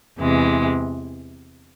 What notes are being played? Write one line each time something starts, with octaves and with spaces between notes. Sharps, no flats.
E2 C3 E3 G#3